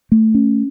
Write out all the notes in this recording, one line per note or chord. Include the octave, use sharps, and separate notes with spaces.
A3
C#4